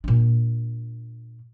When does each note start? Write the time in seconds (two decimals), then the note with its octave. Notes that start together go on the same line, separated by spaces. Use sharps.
0.04 A#2 D4